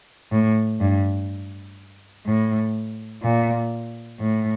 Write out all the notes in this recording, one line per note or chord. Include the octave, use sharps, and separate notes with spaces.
A2
G2
A2
A#2
A2